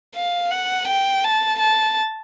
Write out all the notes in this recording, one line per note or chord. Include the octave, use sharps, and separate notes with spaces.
F5
F#5
G5
A5
A5